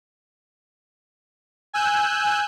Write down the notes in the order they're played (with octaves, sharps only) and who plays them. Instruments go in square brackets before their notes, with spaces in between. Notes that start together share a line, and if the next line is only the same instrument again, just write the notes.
[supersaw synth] G#5 E6 F#6 G6